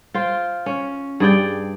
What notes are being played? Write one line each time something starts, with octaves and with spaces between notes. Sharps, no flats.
F4 C5 G5
C#4
G2 G#4 D5 G5